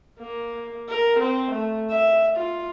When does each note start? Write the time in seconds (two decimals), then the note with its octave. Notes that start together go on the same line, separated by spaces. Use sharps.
0.20 A#3
0.89 A#4
1.19 C4
1.51 A3
1.90 E5
2.37 F4